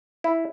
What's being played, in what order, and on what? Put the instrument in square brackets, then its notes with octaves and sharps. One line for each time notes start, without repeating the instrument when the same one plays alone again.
[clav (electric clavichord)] E4